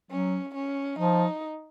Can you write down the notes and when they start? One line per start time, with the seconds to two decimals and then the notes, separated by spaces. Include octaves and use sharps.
0.11 F#3 C#4
0.55 C#4
0.99 F3 D#4